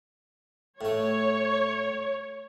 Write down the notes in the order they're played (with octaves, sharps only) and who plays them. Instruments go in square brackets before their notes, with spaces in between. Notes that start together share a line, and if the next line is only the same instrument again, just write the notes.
[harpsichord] A2 A3 [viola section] C#5